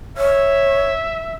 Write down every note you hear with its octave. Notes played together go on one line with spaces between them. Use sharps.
C#5 E5